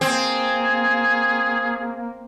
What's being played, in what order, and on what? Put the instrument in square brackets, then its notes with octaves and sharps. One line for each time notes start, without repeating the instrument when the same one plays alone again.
[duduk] A#3 [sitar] C4 [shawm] G#4